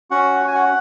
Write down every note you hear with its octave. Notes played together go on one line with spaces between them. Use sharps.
C#4 F#4 F#5
F#4
G#5
F#4 F#5